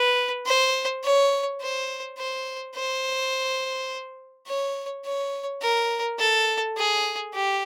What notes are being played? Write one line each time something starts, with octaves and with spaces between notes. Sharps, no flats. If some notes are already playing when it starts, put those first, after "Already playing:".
Already playing: B4
C5
C#5
C5
C5
C5
C#5
C#5
A#4
A4
G#4
G4